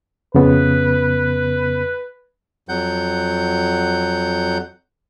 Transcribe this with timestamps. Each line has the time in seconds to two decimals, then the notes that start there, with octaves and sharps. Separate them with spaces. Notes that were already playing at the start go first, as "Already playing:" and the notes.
0.35 F2 C#3 B3 B4
2.69 F2 F#3 F#5 G6